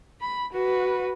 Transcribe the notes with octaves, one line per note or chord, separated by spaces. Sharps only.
B5
F#4 B4